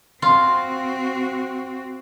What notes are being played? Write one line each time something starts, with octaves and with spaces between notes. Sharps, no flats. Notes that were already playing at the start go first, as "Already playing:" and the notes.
C4 F4 F#4